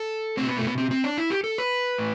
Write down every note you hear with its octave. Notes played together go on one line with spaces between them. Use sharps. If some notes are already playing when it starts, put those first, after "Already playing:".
Already playing: A4
B2 A3 C4
B3
A3
B3
C4
C4
D4
E4
G4
A4
B4
A2